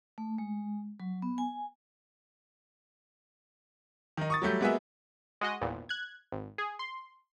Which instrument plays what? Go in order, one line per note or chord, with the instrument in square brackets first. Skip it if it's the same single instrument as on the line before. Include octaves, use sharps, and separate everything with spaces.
[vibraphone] A3
G#3
F#3
B3
G#5
[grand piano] D#3 D#4
C#6 D#6 A6
F#3 G3 A3 G6
G#3 A#3 B3 F#4 G#4 E5
[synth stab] G#3 F#4 D#5
G#1 E2 A#2
F#6 G#6
G#1
G#4
C6